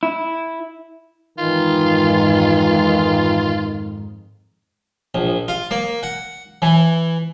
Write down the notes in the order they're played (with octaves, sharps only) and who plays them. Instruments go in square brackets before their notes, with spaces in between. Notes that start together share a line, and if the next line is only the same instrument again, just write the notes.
[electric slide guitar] E4
[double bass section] F2 G#2 [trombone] D#3 [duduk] E3 [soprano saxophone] F4
[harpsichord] A#1
F4
A#3
F#5
E3